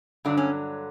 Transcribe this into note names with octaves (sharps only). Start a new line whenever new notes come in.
G2 D3 F#3 D4
C#4